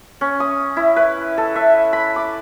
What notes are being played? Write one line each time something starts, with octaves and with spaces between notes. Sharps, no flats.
C#4
D#6
E4
B4
A4
E5
B5
D6